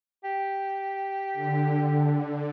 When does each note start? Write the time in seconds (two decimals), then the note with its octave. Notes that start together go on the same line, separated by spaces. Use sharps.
0.24 G4
1.34 D3